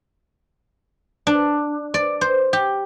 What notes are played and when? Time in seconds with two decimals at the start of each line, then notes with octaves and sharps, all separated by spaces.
1.27 D4
1.94 D5
2.21 C5
2.53 G4